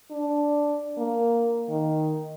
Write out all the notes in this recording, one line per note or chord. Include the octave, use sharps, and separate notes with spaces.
D4
A#3
D#3